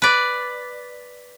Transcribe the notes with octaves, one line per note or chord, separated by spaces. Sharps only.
B4 D5